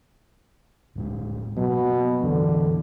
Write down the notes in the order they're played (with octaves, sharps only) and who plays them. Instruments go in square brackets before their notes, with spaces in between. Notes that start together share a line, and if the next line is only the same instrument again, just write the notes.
[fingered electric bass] D1 A2 G#3
[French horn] B2 [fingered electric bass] F#3 A#3
[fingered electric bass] E2 A2 E3 [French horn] D3